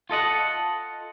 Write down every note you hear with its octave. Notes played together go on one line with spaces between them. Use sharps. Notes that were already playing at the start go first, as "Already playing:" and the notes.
F4 A4 D#5 F#5